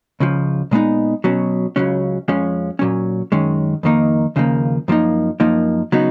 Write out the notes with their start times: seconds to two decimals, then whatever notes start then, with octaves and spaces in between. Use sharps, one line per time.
0.20 C#2 C#3 F3
0.71 A#2 G#3 B3 D#4
1.24 B2 F#3 C#4
1.76 C#2 C#3 F#3 C#4
2.28 F2 F3 G#3 C#4
2.79 A#2 F#3 C#4
3.32 F#2 D#3 G#3 C#4
3.83 F2 D#3 A#3 D#4
4.36 D#2 C#3 F3 A#3
4.88 F#2 F3 A#3 D#4
5.40 F#2 F3 A#3 D#4
5.92 C#3 F#3 B3 D#4